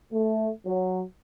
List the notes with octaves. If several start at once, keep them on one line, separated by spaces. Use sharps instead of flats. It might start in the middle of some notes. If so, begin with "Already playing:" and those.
A3
F#3